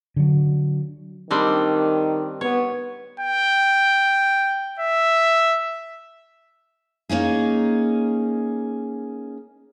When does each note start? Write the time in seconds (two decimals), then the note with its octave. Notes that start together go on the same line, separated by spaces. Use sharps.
0.16 D3 F#3
1.31 D#3 G3 C4 D4
2.41 B3 C#5
3.20 G5
4.79 E5
7.09 A#3 C#4 D#4 G#4